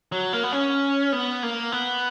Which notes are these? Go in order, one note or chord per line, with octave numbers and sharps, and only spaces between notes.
F#3
A#3
B3
C#4
B3
A#3
B3